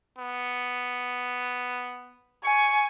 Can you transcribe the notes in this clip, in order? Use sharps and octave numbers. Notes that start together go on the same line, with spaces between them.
B3
G#5 C#6